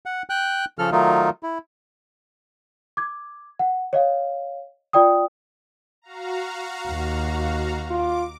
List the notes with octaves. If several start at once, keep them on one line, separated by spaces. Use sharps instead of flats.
F#5
G5 F#6
C#3 F3 A4 F6
D#3 F#3 A3 D#4 F4
E4
D6 G#6
F#5
C#5 D#5 F5
F4 D5 G5 D#6
F#4 F5 A#5
D#2
F4 D6